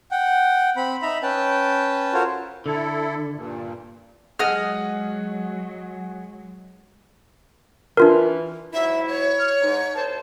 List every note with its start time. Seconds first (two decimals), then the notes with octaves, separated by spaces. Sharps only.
0.11 F#5 G5
0.76 C4 B5
1.02 D#4 E5 A#5 B5
1.23 C#4 B4 G5 A5
2.13 F4 F#4 A4 A#4 C5 C#5
2.66 D3 E4 A4
3.35 G2 A#2
4.39 F#3 G#3 G#4 D#5 F#5 F6
7.97 E3 D4 F4 A#4
8.73 G#2 F#3 E4 E5
9.08 C#5
9.39 F6
9.62 G#2 D#4
9.94 C2 C5 A5